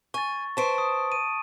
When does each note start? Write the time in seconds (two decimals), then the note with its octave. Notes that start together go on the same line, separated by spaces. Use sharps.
0.14 G#5 C#6 A6
0.57 B4 C5 D#5 A5 C#6 D7
0.78 D#6
1.12 D#7